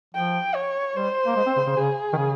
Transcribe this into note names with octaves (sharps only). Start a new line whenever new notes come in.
F3 G5
C#5
G3 C5
A#3
G#3
C4
C#3
C#3
C#3 G#4
D#3
C#3